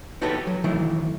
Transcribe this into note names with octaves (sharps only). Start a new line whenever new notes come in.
D#4 F#4 G4 A4 B4 C#5
F#3
D#3 E3 F#3 A3 E4